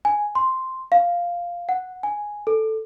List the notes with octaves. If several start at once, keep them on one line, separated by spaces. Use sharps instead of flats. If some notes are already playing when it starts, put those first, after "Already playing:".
G#5
C6
F5
F#5
G#5
A4